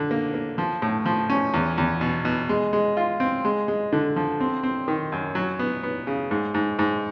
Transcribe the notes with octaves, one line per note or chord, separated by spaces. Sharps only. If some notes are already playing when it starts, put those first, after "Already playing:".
Already playing: D3
A#3
A#3
F3
A2
F3
C#4
E2
E2
B2
B2
G#3
G#3
F4
C4
G#3
G#3
D3
F3
C4
C4
D#3
F#2
F#3
B3
B3
C#3
G#2
G#2
G#2